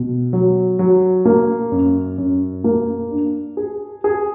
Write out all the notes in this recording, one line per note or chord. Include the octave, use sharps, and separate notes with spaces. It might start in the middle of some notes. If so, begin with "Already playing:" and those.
Already playing: B2
F#3
F#3
A#3
F#2
F#2
A#3
D4
G#4
G#4